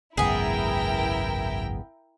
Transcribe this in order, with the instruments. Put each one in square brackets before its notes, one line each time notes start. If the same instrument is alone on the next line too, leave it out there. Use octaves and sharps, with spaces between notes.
[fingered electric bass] G#1 C#2 F#2 [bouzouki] B3 G#4 [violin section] E4 A#4 G5